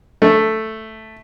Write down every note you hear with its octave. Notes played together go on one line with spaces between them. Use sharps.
A3